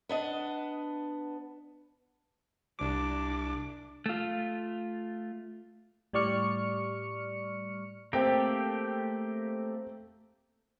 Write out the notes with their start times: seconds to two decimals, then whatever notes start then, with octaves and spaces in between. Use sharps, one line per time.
0.09 B3 D4 D#5
2.79 C2 D4 D6
4.06 A3 F4
6.13 A2 G3 D5 C#6 F6 C#7
8.13 A3 A#3 C4 G4 G5